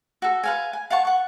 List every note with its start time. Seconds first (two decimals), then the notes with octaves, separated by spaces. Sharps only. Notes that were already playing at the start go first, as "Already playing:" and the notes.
0.22 F#4 A4
0.44 B4 F5 G#5
0.73 G#5
0.90 F5 F#5 A5 C#6
1.05 F#5 C#6